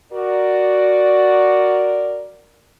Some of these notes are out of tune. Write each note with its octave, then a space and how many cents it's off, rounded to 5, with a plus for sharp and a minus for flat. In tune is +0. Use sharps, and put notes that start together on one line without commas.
F#4 +0 A#4 +0 D5 +0